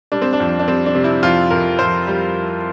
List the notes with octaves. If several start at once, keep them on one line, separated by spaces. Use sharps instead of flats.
G3 D4
C4
D4
F2
D4
G3 C4
D4
C3
E4
F2 F4
F2 A#4
F2 C5
G3